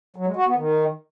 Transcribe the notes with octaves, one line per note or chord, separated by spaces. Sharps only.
F#3
G#3
F#4
B3
D#3